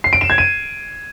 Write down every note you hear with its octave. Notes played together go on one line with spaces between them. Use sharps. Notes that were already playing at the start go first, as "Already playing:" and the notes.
C7
D7
E7
G#6
D#7